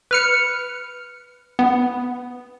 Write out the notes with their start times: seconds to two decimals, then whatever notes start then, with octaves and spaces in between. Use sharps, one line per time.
0.11 B4 F6 C#7
1.59 B3